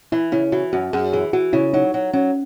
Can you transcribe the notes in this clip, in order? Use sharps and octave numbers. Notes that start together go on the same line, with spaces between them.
E3 E4
C#3 E4
E3 F#4
F#2 F#4
F#2 G#4
E3 G#4
E3 F#4
C#3 E4
F#3 D#4
F#3
F#3 C#4